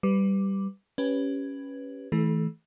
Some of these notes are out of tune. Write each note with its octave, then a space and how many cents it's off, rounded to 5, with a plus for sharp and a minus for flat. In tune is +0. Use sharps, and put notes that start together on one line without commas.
G3 -5 B4 +10 D6 +0
C#4 +0 G4 +0 B4 +0
E3 -25 A3 +0 A4 -40